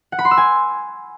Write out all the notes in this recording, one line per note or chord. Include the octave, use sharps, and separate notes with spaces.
F#5
B5
C6
E6
G#5